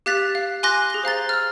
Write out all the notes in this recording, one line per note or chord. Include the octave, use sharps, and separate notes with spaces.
G4 F5 F#6 A6 B6 F7
F5
G#5 C6 D6 F#6 A#6
G#4 G7
C5 F5 A#5 A6
E6 F6